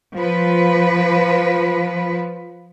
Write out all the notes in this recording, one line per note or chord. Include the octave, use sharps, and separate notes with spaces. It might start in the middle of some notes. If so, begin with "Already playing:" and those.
F3 B4